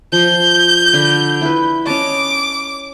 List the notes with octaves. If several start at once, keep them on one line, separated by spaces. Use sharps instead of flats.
F3 G6
D3 B5
E4 B4
C#4 D#5 A5 D6